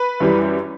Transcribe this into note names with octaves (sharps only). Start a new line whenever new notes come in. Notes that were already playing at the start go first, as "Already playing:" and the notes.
Already playing: B4
F#2 E3 G3